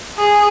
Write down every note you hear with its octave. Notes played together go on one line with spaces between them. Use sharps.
G#4